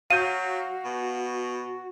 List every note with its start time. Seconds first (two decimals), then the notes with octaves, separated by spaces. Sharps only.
0.10 F#3 F#4 F5 G6 D#7
0.85 B2